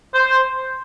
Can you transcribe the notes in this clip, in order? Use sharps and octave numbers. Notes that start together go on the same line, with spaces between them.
C5